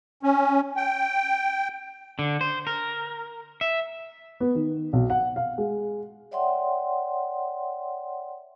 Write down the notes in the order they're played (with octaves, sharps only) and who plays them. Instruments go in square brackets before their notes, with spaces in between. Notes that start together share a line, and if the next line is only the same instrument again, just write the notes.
[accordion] C#4
G5
[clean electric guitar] D3
C5
A#4
E5
[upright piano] B3
D#3
B1
F#5
F5
G#3
[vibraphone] C#5 D5 E5 F#5 G5 C6